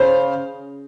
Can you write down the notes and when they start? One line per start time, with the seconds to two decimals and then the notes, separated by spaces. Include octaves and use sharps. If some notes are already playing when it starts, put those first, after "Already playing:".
Already playing: C#3 C5